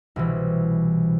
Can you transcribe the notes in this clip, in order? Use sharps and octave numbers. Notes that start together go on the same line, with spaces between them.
C2 B2 E3